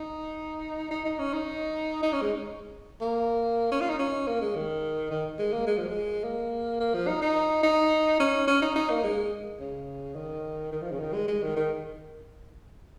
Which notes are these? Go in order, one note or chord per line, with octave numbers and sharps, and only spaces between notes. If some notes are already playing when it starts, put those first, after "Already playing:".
Already playing: D#4
D#4
D#4
C#4
D#4
D#4
C#4
G#3
A#3
C#4
F4
D#4
C#4
A#3
G#3
D#3
D#3
G#3
A#3
G#3
F3
G#3
A#3
A#3
F3
D#4
D#4
D#4
C#4
C#4
D#4
D#4
A#3
G#3
C#3
D#3
D#3
F3
C#3
D#3
G#3
G#3
D#3
D#3